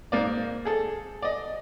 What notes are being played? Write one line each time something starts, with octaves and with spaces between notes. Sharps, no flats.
G#2 A#3 D5
G#4 A4
D5 D#5